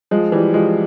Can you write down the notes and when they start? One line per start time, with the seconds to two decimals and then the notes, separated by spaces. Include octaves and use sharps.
0.11 F3 G#3
0.32 E3 G3
0.54 F3 G#3